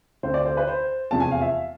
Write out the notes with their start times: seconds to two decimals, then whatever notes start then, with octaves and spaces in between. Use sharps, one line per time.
0.23 D2 D3 A3 C4 C5
0.34 D5
0.46 C5
0.57 B4
0.67 C5
1.11 F1 E2 C3 F3 A5
1.20 G#5
1.31 F5
1.41 E5